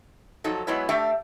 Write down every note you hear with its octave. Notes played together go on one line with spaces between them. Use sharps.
F3 F#3 D#4 A4
F#3 G#3 B3 E4 C#5
A3 D4 G4 A4 E5 G5